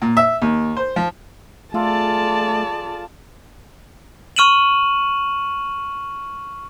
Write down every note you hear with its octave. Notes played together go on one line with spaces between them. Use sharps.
A#2
E5
D#2
C5
F3
A3 F4 G#4 A4 D5 A5
C#6 F6 D#7 E7 F#7